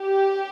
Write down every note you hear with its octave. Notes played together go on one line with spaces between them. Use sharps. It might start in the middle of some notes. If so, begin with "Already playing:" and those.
Already playing: G4